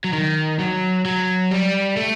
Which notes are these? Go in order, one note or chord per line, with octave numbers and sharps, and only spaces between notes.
F#3
D#3
F#3
F#3
G3
A3